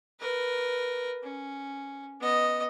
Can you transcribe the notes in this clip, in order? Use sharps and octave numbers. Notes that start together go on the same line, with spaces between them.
A#4 B4
C#4
B3 D#5